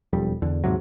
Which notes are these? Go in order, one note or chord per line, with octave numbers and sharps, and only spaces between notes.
E1 F2 G3
E2 D3
D#2 G#2 C3 F#3